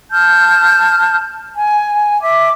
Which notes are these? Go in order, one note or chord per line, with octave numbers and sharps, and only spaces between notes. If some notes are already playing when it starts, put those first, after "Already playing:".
A5 F6 G6
G#5
E5 D6